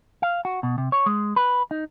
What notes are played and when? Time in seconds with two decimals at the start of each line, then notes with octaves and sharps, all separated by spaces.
0.22 F5
0.45 F#4
0.63 B2
0.78 C3
0.92 C#5
1.06 G#3
1.36 B4
1.71 D#4